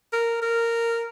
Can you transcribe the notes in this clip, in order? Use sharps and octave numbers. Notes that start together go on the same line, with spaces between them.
A#4
A#4